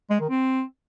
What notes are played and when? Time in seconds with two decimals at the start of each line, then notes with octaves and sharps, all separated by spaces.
0.10 G#3
0.20 D#3
0.30 C4